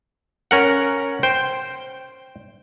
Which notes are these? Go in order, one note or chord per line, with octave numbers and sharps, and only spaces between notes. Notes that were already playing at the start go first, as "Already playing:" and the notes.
C#4 A#4 F#5
C5 G5